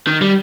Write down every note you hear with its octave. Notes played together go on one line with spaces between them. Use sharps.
D#3
G3